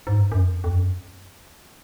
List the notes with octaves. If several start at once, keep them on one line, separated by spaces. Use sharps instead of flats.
G#2
G2
F#2
F2
F2
F#2